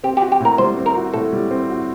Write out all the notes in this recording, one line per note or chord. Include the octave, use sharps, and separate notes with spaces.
C4 G4
F#4 G4
G4
A2 A#4
G3 C5
C4
A#4
F#4
A2 A4
G3
C4
F#4